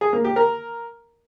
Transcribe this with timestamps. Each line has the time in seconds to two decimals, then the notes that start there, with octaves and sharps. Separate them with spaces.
0.01 G#4
0.13 A#3
0.24 G4
0.36 A#4